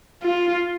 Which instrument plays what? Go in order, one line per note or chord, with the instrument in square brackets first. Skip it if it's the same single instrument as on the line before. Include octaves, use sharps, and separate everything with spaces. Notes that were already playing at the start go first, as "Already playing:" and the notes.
[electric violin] F4